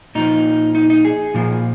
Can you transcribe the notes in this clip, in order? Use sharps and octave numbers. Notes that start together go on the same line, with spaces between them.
A#2 F3 D#4
D#4
D#4
G#4
A#2 F3